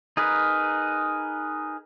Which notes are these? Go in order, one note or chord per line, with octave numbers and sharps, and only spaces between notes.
D#4 G#4 A#4 B4